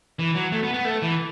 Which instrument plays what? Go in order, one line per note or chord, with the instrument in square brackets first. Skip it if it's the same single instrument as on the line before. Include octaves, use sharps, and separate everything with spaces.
[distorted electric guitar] E3
F#3
A3
B3
B3
A3
E3